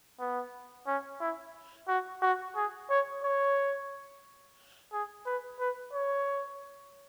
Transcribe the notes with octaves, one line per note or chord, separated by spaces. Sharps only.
B3
C#4
E4
F#4
F#4
G#4
C#5
C#5
G#4
B4
B4
C#5